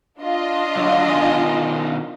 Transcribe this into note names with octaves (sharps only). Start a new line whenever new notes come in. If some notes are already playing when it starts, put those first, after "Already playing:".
D4 F4 D#5
D3 F#3
B2 D#3 G#5